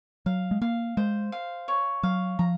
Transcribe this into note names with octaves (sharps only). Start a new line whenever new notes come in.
F#3 F5
G#3
A#3 F5
G#3 C5
F5
C#5
F#3 F5
F3 A#5